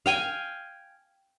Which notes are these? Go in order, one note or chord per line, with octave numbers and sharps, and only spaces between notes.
F5 G5 G#5